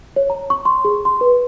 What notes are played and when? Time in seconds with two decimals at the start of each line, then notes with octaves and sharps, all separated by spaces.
0.16 C#5
0.30 A#5
0.50 C#6
0.65 C6
0.85 G#4
1.05 C6
1.21 B4